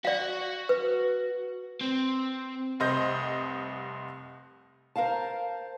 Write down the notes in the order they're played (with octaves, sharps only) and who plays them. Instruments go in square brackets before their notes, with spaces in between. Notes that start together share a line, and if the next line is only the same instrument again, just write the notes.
[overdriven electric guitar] F#4 F#5 [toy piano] D5 F5
[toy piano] B4
[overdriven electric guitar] C4
[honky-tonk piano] F1 C2 C5 D#5 G6 A#6
[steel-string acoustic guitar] A#4 C5 F5 A5